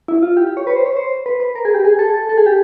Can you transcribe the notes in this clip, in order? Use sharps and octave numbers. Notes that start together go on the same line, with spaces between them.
E4
F4
G4
G4
C#5
B4
C5
C#5
C5
B4
B4
A#4
G#4
G4
G#4
A4
A4
A4
G#4
G4